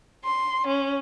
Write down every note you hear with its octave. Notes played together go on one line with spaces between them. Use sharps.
C6
C#4